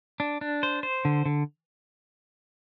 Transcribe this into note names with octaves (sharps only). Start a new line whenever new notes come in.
D4
D4
C5
C5
D3
D3